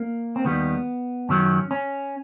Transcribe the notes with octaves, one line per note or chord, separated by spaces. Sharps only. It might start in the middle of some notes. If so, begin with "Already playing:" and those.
Already playing: A#3
C4
D#2 D#3 G3 B3
F#2 D#3 F#3 C#4
C#4